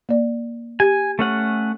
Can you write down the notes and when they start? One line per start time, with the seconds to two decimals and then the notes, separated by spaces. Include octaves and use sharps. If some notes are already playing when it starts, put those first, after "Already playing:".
0.09 A#3 D5
0.80 G4 G#5
1.19 A3 C#4 F#5